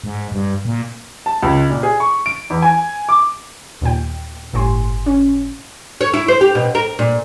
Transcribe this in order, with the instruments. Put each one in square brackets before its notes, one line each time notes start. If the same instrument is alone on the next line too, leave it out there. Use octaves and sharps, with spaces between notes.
[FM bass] G#2
G2
A#2
[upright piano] A5
C#2
A#2
G#4
C#6
D7
E2
G#5
D6
[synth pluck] D#2 A#2 G5
G1 A2 G4 G#5 C6
C#4
[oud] C#5
E4
C5
G4
B2
A#4
A#2